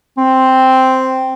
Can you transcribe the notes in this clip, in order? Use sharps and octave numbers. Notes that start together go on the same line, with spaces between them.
C4